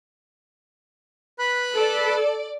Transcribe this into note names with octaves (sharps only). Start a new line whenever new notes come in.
B4 B5 F#6
A4 D5